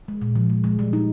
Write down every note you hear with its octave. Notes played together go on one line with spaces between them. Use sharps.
G#3
A#2
F3
G#3
G#3
G3
D#4